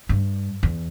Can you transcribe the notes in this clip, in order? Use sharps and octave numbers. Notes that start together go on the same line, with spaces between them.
G2
E2